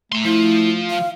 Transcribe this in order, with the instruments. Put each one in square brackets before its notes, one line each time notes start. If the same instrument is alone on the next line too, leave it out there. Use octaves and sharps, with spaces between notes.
[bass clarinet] A3 [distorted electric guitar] A#5 C6
[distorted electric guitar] F3 [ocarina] E4
[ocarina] F5